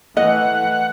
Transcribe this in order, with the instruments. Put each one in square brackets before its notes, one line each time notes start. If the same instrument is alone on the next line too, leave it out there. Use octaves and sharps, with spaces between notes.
[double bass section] E3 A3 [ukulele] D#5 [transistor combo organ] F#5